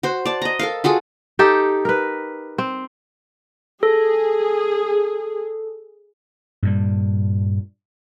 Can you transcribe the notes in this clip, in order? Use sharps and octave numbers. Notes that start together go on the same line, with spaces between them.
F#4 C5
D5 A5
D#5 A#5
A4 A#4 F5
F4 F#4 G#4 A4
D#4 G4 A4
A#4 B4
C4
G#4 A4
G2 A#2 G3